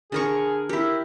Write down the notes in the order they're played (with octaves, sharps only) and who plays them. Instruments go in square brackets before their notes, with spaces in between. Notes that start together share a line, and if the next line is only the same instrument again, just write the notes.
[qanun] D3 A#4 C#6 [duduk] G#4
[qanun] E4 G4 [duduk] A#4